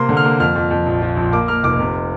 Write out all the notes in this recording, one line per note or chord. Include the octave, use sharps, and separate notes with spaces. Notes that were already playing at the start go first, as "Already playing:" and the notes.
Already playing: C3 A#3 C6
D3
F6
A#3
F2 F6
F2
F2
A#1
F3
A#1
A#3 D6
A#3 F6
F1 D6
C3